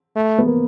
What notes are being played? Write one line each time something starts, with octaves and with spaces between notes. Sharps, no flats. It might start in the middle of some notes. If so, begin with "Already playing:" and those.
A3
B3
A#3